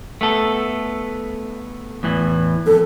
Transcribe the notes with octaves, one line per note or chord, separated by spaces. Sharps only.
A3 B3 A4
E2 A2 E3
F2 A4